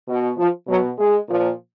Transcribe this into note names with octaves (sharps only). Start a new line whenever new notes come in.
B2
F3
B2 F#3
G#3
A#2 F3